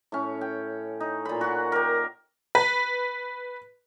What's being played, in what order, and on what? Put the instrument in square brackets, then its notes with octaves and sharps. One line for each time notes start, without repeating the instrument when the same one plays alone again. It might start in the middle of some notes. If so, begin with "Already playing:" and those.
[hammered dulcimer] A2 C#4
G5
D#4
A#2 B5
F#4 F#5
G4 A#4
[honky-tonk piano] B4